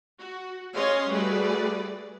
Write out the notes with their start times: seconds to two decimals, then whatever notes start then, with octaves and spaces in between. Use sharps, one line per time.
0.18 F#4
0.74 C#4 C#5 D#5 F5 C6
1.09 G3 A3 F#4 G#4 B4 D5